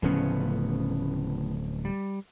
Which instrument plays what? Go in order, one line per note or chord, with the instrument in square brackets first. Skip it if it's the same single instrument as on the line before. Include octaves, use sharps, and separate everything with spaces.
[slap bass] D1 F3 C#4 [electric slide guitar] A2 C#3 B3
[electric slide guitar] G3